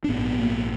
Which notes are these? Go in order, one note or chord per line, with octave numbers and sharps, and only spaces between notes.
D4
A#1 G#2 B3
A#3